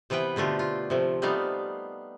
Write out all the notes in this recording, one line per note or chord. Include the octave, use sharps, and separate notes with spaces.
C3 E3 B3 B4 G5
B2 D3 A3 F4 G4
F4
C3 F3 A3
G3 A3 B3 D#4 F5